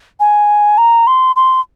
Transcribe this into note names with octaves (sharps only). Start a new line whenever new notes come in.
G#5
A#5
C6
C6